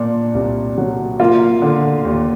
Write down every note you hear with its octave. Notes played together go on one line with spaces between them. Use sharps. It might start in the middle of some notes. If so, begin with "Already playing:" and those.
Already playing: A#2 A#3 D4
C2
F#3
A#3 F4
D3
D#2